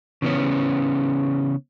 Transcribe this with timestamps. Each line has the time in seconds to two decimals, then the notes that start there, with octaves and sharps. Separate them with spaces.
0.22 C#3 E3 B3 C#4